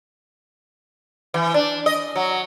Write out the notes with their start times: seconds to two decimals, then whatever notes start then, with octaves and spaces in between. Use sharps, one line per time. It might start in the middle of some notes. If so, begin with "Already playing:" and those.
1.34 E3
1.54 D4
1.86 D#5
2.16 F#3